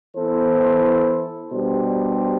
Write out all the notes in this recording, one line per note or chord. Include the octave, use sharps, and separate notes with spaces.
E3 B3 E4 A4 C5
B2 G3 D4 G4 C5